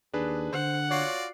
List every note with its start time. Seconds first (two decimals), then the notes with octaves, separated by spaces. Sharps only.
0.13 D#2 D4 G#4 B4
0.53 D3 C5 F#5
0.91 F4 F#4 C#5 D5 C#6 C7